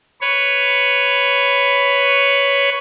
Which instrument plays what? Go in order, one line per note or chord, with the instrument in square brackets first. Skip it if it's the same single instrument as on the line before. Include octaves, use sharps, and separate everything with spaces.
[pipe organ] B4 C#5